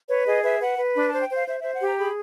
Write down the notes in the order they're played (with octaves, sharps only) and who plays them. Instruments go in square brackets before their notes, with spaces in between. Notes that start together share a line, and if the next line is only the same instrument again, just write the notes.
[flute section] B4 C#5
G#4 D#5
B4 E5
B4 F#5
B4
D4 B5
C5 A5
G5
C5 F5
C5 E5
C5 E5
F#5
G4 A#5
G#4 B5